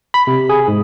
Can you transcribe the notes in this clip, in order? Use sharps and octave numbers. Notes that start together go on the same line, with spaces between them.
B5
C3
G#4
G#2